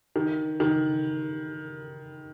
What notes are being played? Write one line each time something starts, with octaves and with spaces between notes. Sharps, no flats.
D#3
D#3